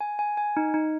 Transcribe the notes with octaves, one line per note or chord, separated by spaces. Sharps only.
G#5
G#5
G#5
D#4
D#4